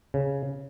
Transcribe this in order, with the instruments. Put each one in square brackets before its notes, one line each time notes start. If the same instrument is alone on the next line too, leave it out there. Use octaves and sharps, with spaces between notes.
[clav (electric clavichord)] C#3